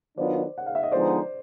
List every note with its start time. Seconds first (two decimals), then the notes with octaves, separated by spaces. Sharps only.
0.17 D#3 F#3 B3 D4 F4 C5 D5
0.58 F#5
0.66 F5
0.75 E5
0.83 D#5
0.92 D3 F3 G#3 B3 D#4 C5 D5